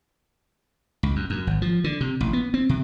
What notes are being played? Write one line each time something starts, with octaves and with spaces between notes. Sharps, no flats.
C#2
F#2
F#2
G#1
F3
D3
C3
A1
B3
C4
C3